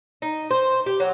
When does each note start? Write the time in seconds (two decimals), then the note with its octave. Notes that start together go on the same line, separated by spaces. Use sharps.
0.22 D#4
0.51 C5
0.86 G4
1.00 F#3